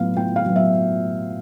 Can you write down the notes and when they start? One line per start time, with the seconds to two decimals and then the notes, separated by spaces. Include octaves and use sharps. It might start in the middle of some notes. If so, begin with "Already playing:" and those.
Already playing: A2 F#3 B3 F5
0.16 A2 G5
0.36 F5
0.46 F#3 B3
0.56 E5